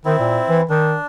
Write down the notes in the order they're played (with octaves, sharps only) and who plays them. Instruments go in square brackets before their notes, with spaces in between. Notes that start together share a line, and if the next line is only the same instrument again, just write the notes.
[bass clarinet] D#3 [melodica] C4 E4
[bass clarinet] A#2
E3
[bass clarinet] D#3 [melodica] D4